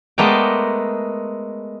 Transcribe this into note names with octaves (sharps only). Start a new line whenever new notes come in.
G#3 A3 B3 A#4 D5 G5